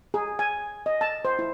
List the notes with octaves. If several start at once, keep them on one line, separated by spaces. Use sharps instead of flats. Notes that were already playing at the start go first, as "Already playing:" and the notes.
G#4
G#5
D#5
A5
C5
E4